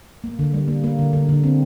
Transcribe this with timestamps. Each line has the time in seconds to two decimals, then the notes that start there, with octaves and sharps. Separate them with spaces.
0.24 A#3
0.39 D3
0.54 G3
0.68 A#3
0.84 A#3
0.99 D3
1.13 D3
1.29 D3
1.44 C4